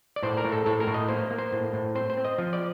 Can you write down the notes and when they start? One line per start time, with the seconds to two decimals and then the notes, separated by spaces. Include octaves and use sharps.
0.16 D5
0.23 A2 C5
0.37 A#4
0.45 A2
0.52 A4
0.66 A2 A4
0.80 A#4
0.87 A2
0.94 D#5
1.09 A#3 C5
1.31 A#3
1.38 C5
1.53 A2
1.73 A2
1.95 C4 C5
2.10 C5
2.17 C4
2.25 D#5
2.38 F3
2.53 D5